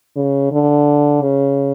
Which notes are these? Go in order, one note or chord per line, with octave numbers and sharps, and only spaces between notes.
C#3
D3
C#3